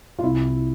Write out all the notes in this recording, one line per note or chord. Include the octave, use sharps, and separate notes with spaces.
F4
C2 E4